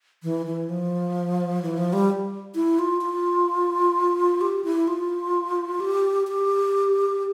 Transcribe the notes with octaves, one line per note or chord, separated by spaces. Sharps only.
E3
E3
F3
E3
F3
G3
E4
F4
F4
G4
E4
F4
G4
G4